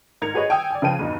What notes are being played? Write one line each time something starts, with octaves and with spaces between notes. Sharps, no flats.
G#2 A#4 G#6 C#7 F7
F#4 G#4 B4 C#5 D#5
G5 G#5 D#6 E6 G#6
D5 G#5
C#3 F3 B4 G5 D#7
E2 G2 B2 D#4